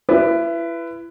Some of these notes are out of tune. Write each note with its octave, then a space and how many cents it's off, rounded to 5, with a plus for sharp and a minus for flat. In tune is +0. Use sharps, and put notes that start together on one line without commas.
E4 +30 B4 +0